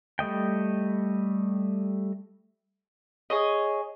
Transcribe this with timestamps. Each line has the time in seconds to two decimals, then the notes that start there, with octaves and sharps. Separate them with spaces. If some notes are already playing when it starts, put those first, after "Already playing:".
0.19 G3 A3 D#5 G5
3.30 G#4 C#5 D#5